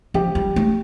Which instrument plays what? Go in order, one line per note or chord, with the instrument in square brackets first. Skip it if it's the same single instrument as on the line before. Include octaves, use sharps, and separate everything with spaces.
[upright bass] F3 [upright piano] G4
[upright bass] G3
A3